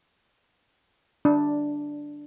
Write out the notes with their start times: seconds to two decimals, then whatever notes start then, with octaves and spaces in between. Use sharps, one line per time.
1.25 D4